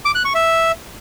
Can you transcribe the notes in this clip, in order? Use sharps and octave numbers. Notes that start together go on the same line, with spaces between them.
D6
F#6
C#6
E5